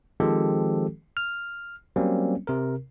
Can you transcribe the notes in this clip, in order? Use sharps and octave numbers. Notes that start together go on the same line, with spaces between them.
D#3 F3 G#3 C4 G4 A4
F6
F#3 G3 A#3 C4 C#4
C3 A#4